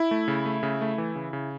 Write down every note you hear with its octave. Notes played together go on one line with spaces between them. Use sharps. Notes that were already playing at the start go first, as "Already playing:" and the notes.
Already playing: E4
A3
C#3
A3
C#3
A3
E3
C#3
C#3